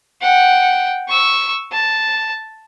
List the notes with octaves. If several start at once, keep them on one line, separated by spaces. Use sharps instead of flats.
F#5 G5
C#6 E6
A5